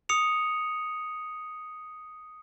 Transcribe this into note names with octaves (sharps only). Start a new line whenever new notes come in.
D#6 C#7 F7